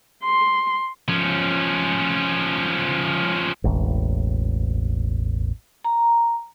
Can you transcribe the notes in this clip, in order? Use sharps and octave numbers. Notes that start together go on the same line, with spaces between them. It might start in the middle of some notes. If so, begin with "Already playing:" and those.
C6
F3 C#4
E1 A1
A#5